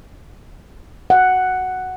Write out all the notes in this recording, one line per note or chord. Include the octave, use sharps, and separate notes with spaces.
F#5